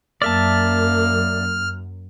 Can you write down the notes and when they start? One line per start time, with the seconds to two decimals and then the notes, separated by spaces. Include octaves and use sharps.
0.22 F#2 A#3 D5 E5 A5 F6